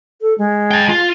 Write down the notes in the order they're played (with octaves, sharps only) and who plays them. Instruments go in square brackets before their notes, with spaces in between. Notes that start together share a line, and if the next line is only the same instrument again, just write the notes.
[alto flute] A4
G#3
[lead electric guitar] G5 A5
F4